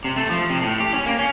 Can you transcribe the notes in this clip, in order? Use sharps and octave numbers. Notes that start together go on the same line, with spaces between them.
C3
A3
F3
C3
A2
G4
C#4
A#3
C#4